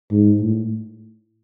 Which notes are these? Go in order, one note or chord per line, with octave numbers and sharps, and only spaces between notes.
G#2
A2